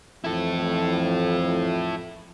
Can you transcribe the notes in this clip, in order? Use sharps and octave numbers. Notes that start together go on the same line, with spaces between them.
F2 E3 F3 E4 A4